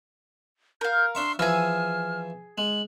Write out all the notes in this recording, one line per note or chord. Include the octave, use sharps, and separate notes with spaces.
A#4 F5 G6
D4 E5 C6 C#6
E3 F3 E4 G#4 E6 F6
G#3 F#7